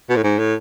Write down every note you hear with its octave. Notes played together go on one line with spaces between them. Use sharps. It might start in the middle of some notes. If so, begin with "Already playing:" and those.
B2
A2
G#2
A2